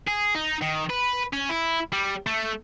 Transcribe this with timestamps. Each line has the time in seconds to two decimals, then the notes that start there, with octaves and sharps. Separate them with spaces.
0.07 G#4
0.35 D#4
0.62 D#3
0.90 B4
1.33 C#4
1.50 E4
1.93 G3
2.27 A3